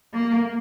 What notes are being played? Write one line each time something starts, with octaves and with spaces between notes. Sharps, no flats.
A#3